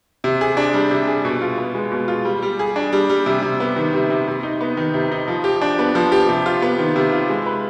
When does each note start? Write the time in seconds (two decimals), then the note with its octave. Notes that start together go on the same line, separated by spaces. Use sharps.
0.24 C3
0.41 G#4
0.57 D4
0.74 G3
0.91 C3
1.07 G#4
1.25 B2
1.41 F4
1.58 B3
1.75 G#3
1.92 B2
2.08 F4
2.25 G3
2.42 G3
2.59 G#4
2.76 D4
2.93 G3
3.10 G3
3.26 C3
3.42 C3
3.60 B3
3.76 D#3
3.94 C3
4.10 C3
4.28 C3
4.43 D#4
4.61 B3
4.77 D#3
4.94 C3
5.12 D#4
5.28 F3
5.44 G4
5.62 D4
5.79 B3
5.95 F3
6.12 G4
6.29 C3
6.46 F4
6.62 B3
6.79 D#3
6.96 C3
7.12 F4
7.29 G#3
7.46 B4